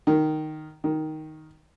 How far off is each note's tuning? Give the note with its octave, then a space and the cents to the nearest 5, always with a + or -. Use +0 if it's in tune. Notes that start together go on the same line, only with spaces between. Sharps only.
D#3 -10
D#3 +0